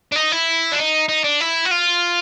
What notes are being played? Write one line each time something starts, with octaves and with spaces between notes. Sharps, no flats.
D4
D#4
E4
D4
D#4
D#4
D4
E4
F#4
F4